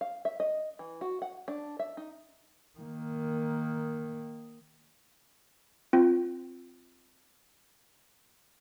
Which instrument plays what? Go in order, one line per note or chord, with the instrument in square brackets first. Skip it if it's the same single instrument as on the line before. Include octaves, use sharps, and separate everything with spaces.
[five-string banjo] F5
E5
D#5
E3
F#4
F#5
D4
E5
D#4
[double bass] D#3 A#3
[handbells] C4 F4